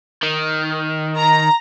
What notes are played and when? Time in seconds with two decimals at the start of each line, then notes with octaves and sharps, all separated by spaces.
0.23 D#3
1.16 A#5